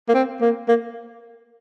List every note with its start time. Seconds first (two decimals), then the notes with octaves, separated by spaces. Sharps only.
0.09 A#3
0.14 C4
0.41 A#3
0.69 A#3